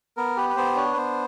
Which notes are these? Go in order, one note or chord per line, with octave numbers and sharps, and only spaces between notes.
B3 A#4
G4 B4
B4
B3 C5
D4 C#5
B4
B3 C5